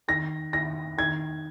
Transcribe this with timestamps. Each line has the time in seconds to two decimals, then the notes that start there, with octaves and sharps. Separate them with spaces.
0.08 D#3 A#6
0.53 D#3 A#6
0.98 D#3 G#6